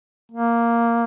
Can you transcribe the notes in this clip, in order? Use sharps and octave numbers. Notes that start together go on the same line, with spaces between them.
A#3